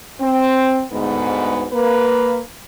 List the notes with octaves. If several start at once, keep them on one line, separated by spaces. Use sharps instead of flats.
C4
D2 G#2 B3
A#3 B4